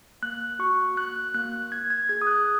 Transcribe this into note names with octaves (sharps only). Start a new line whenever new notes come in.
A#3 F#6
F#4 C#6
A#3 F#6
A#3 F#6
A#3 G#6
G#6
G#4 G#6
D#6
F#6